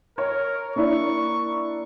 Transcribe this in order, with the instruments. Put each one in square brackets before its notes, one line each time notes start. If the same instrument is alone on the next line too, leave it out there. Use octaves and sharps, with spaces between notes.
[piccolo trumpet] A#4 [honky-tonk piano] C#5
[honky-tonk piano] A#3 D4 E4 [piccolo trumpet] C#6